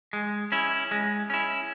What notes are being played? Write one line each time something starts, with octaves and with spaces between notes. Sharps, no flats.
G#3
C#4 E4
G#3
C#4 E4